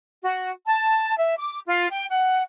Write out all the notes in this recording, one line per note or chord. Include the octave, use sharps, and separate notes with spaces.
F#4
A5
E5
D6
F4
G5
F#5